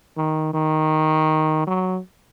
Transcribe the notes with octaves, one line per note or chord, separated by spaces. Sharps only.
D#3
D#3
F#3